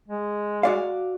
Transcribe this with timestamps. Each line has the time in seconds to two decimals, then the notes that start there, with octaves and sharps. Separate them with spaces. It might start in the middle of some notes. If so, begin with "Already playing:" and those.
0.08 G#3
0.63 F#4 D5 F5